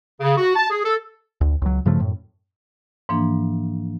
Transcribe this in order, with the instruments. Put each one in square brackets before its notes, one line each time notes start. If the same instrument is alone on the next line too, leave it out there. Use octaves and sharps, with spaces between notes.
[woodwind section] C#3
F#4
A5
G#4
A4
[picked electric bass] D2
C#2 F#3
G2 C#3 F3 A3
F#2 A2
[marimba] G#2 E3 F3 A#3 D4